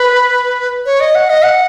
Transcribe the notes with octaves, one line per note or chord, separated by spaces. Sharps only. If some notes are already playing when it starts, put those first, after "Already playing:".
Already playing: B4
C#5
D#5
F#5
D#5
F#5